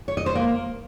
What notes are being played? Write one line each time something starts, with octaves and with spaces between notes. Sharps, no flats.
C#5
D#5
C5
A#3